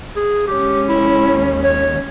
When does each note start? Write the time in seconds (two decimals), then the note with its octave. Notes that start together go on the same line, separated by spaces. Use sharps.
0.16 G#4
0.47 G#3 C#4 G4
0.89 F1 E4
1.29 D#2
1.64 C#5